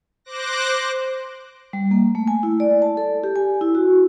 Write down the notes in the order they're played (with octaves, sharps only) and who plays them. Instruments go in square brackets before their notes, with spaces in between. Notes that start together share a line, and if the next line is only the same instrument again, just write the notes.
[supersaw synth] C5 D6 F#6 A#6
[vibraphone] G3
A#3
A3
G#5
E4
D5
A5
A4
G4
G#5
E4
F#4